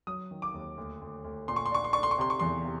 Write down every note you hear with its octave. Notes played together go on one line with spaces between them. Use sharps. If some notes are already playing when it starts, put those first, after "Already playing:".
F#3 D#6
D#3
D6
D#2
D2
D2
D2
A#2 C6
C#6
C6
D4 C#6
C6
D4 C#6
C6
C#6
C3 C6
C#6
E2 C6
C3